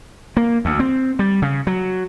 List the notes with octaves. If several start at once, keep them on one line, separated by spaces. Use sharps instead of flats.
A#3
D2
C4
G3
C#3
F#3